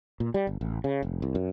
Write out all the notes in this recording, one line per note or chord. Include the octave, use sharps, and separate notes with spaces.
A#2
G3
G1
A1
C#3
F1
C2
F#2